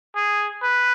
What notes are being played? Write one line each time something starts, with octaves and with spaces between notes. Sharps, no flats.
G#4
B4